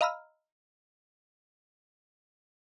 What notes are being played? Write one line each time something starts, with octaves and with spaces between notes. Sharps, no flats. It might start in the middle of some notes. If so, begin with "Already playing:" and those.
D#5 F5 A#5 B5 E6 F6